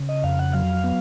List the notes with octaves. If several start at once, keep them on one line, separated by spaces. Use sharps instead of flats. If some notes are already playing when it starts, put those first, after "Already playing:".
Already playing: C#3
D#5
F2 F5
F#5
F#3 F5
B3